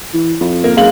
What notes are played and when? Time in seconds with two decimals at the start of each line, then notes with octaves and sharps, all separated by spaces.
0.13 E3
0.40 F2
0.64 A#3
0.77 F#1 G#3 F5 F#7